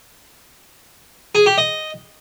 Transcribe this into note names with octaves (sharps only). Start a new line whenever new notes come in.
G#4
G4
D#5